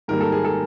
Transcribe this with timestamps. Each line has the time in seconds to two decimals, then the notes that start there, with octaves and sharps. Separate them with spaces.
0.08 G#2 D#3 G3 A#3 A#4
0.21 A4
0.32 G#4
0.45 A4